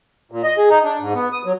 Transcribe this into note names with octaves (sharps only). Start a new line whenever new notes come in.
A#2
D#5
G#4
D#4
D4
G#2
B3
D#6
F#3